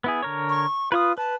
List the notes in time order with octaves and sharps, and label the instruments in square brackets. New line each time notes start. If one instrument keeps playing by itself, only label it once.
[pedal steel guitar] B3 E4 G#4
D3 A#4 C#5
[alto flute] C#6
[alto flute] F4 [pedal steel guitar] B4 C#5 D#6
[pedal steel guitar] B4 [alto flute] A5